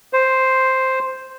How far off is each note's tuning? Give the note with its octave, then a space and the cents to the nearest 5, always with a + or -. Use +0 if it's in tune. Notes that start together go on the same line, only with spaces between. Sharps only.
C5 +0